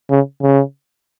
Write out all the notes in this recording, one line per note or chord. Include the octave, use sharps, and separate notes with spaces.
C#3
C#3